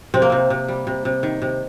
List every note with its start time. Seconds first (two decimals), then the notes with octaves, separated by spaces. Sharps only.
0.14 C3 C4
0.22 A#3
0.30 C3 C4
0.50 C3
0.68 G3
0.87 C3
1.05 C3
1.23 D#3
1.42 C3